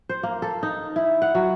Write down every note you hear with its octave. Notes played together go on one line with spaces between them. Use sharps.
C5
A#3
A4
D#4
E4
F#5
F#3